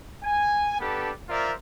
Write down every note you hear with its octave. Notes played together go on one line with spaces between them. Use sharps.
G#5
B3 D4 G4 A4 B4
F4 A#4 C5 D5 E5